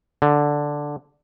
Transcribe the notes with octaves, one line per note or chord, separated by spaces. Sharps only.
D3